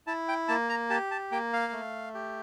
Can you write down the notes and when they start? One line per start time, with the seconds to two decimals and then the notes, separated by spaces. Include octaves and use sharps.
0.07 E4 A5
0.28 G5
0.48 A#3 A5
0.69 A#5
0.90 G4 A5
1.11 A5
1.32 A#3 G5
1.53 F5
1.73 A3
2.14 G4